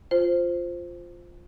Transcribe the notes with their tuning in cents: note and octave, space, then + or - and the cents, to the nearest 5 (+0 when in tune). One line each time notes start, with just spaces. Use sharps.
F4 +0 C5 +0